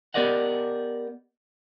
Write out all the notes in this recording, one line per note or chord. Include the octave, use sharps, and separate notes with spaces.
B3 G4 A#4 D5 D#5 F#5